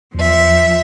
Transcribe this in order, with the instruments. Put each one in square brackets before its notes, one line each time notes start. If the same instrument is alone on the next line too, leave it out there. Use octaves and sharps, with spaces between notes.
[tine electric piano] E2 [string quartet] F3 E5